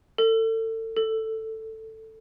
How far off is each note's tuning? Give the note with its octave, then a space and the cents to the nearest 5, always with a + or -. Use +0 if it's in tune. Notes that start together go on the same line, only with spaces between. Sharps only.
A4 +30
A4 +10